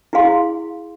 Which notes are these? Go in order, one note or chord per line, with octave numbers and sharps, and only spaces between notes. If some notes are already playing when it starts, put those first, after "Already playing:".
E4 F#4 G#4 F5 C6